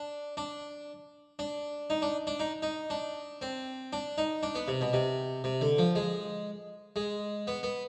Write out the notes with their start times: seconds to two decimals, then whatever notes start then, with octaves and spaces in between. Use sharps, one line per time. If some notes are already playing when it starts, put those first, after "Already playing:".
Already playing: D4
0.37 D4
1.39 D4
1.90 D#4
2.02 D4
2.27 D4
2.40 D#4
2.62 D#4
2.90 D4
3.42 C4
3.93 D4
4.18 D#4
4.43 D4
4.55 B3
4.68 C3
4.81 B2
4.93 C3
5.44 C3
5.61 D3
5.79 F3
5.95 G#3
6.96 G#3
7.47 B3
7.63 B3